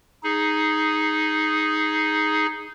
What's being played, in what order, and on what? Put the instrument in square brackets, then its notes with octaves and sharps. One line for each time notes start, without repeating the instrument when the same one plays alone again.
[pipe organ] D#4 G#4